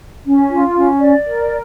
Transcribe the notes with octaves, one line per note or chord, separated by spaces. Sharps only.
C#4
F4
C#4
D5
A#4